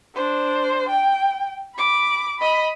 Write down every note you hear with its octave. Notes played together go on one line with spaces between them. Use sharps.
D4 C5
G5
B5 D6
D#5 B5